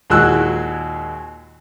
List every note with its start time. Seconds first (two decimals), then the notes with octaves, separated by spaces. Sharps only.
0.10 D#2 A#2 G#3 F#4 E6 F#6